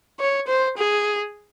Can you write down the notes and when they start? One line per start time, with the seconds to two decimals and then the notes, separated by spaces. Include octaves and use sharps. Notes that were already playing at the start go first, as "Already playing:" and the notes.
0.20 C#5
0.48 C5
0.77 G#4